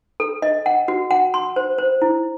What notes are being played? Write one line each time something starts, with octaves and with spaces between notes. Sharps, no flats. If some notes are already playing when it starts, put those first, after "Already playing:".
A4
D#5
F#5
F#4
F#5
C6
C5
C5
E4